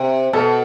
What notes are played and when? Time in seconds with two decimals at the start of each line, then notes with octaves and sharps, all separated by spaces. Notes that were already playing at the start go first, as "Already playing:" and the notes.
Already playing: C3
0.33 B2 A4